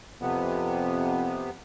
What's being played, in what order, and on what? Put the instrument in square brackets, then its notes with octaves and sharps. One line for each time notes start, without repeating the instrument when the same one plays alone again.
[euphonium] F2 [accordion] C3 B3